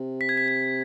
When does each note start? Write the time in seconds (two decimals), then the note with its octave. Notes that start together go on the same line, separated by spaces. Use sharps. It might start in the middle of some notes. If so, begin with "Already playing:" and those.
Already playing: C3
0.21 B6
0.29 G#6
0.37 B6
0.48 B6